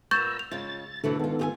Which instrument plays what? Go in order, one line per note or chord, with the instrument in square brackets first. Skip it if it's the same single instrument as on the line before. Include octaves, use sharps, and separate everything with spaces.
[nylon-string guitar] A#2 B3 [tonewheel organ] A#5 E6 [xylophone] C#6 G6 A6
[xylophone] F7
[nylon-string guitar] C#3 G#3 F4 [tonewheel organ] A6
[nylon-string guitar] B2 E3 A3 [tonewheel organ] D3 A4
[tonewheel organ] D#3 B3 A4 [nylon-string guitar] G#3 F4
[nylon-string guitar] F4 G4 G#5